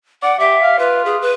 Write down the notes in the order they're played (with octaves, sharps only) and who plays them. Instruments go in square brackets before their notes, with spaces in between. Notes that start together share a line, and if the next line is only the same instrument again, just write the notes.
[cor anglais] D5 [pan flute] F#5
[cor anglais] G4 [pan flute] E5
[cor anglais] F5
[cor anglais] F4 [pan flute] B4
[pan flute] G#4
B4